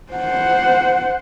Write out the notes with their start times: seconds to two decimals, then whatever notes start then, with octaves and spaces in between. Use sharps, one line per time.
0.12 C5 F#5